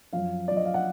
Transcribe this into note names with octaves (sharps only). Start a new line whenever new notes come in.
F#2 F3 F5
F#2 F3 D5
D#5
F5
F#5